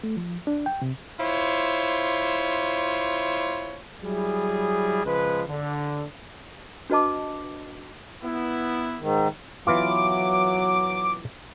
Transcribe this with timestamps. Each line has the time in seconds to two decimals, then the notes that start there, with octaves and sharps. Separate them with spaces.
0.03 A3
0.17 F3
0.47 D4
0.66 G5
0.82 C3
1.19 E4 F4 C5 C#5
4.04 F#3 G3 E4 G#4
5.05 C#3 F3 G#3 B4
5.49 D3
6.90 D4 F#4 B4 D#5 A5 D6
8.22 B3 E4
9.00 G#2 D#3
9.67 E3 F#3 B3 F4 D6